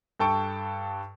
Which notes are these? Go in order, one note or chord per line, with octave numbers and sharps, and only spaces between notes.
G2 A4 G5 A5 C#6 D7